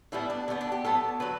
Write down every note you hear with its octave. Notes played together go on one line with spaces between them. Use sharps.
A2 E3 G3 B3 E4
D4
D3 G3 B3 C#4
D4
G4
A2 F#3 B3 A4
D3 F#3 B4